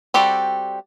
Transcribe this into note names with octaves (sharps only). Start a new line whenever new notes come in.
G3 C4 F#4 G4 A4